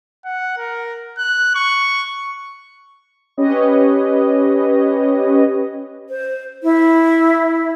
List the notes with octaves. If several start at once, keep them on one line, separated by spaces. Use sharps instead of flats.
F#5
A#4
F#6
C#6
C#4 G4 B4 C#5 D#5
C5
E4